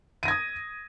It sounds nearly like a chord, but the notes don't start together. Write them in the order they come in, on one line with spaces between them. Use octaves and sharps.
D#7 A#6 G#6 D#6